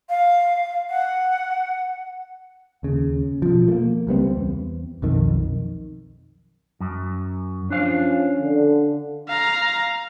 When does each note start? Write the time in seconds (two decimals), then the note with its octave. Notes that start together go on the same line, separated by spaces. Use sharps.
0.09 F5
0.90 F#5
2.83 D#2 C#3
3.42 B2 F3
3.68 A3 A#3
4.07 C#2 G3 B3 C4
4.35 E2
5.02 B1 F2 D#3
6.80 F#2
7.70 F3 C#4 D4 F5
8.40 D3
9.29 F5 A#5